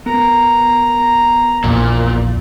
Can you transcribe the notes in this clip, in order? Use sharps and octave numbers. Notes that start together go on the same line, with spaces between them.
B3 A#4 A#5
A#1 E2 A#2